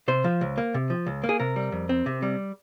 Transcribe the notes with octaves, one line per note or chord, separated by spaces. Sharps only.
C3 C5
F3
C#2
A#3
C3
F3
C#2
A#3
G#4
C3 A#4
G3
F2
C4
C3
G3